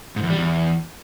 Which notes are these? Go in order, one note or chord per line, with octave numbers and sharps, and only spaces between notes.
G#2
E2
G3
E2